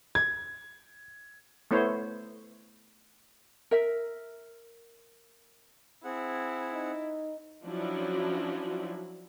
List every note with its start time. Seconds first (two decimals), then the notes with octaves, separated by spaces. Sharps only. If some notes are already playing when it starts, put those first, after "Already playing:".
0.15 G#6
1.71 A3 B3 E4 C5 C#5
3.71 A#4 E5
6.05 C4 E4 G#4 F#5
6.72 D#4
7.65 F3 F#3 C#4 D4 E4 F#4